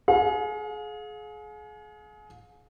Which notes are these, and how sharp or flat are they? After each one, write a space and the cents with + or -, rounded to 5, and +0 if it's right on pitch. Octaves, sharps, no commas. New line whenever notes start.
G#4 +30 F5 +40